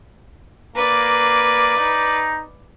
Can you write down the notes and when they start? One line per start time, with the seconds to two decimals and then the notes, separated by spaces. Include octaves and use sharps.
0.76 A#3 B4 D5
1.77 D#4